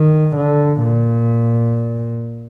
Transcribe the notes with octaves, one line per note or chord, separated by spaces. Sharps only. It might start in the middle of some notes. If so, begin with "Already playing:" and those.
Already playing: D#3
D3
A#2